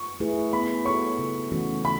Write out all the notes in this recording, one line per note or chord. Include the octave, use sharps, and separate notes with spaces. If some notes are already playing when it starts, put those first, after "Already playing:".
Already playing: C#6
A3 E4 G#4 B4
B3 B5
F#4 A4 C#5 C#6
C#3
E3 A3 C#4 F#4
C#3 B5